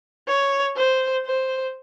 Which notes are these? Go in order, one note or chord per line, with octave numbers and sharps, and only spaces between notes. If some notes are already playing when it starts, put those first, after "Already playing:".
C#5
C5
C5